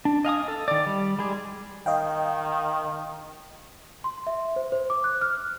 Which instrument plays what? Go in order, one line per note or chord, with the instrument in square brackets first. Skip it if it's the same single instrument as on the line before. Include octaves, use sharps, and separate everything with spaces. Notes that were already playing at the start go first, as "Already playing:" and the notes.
[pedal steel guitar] D4
D#5 F5 G#5 D#6
A4
D#3 D5
G3
G3 G#3 G#4
[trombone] D#3 [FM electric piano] D#5 F5 G5
[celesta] C6
E5
C5
C5
D6
F#6
F6